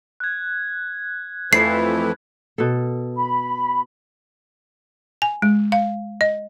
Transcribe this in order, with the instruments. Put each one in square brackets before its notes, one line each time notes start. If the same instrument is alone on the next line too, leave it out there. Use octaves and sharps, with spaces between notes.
[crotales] F#6 G#6
[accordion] F2 E3 F3 [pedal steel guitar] A3 E4 [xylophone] C7
[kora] B2 A4
[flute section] B5
[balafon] G#5
G#3
F5
D#5